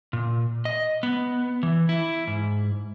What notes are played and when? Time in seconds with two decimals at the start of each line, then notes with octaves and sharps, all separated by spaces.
0.13 A#2
0.65 D#5
1.03 B3
1.63 E3
1.89 E4
2.27 G#2